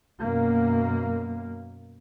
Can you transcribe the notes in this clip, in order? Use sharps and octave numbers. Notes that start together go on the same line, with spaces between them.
F#2 B2 A#3